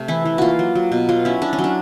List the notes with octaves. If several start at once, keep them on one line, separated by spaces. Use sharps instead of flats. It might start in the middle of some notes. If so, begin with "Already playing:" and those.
Already playing: C3 A3
E3 E4
E3
A#3 F4 F#4
F#3
F#3
B2
F#3 F4
C#4 E4
C#4 D4
C#4
F#3
D4